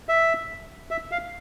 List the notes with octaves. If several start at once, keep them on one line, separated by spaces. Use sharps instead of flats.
E5
E5
F5